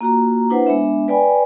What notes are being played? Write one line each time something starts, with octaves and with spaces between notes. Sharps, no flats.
A#3 F4 F#4 A#5
D4 E4 B4 C5 F#5
G#3 B3 D4 E5
B4 D5 G5 G#5 B5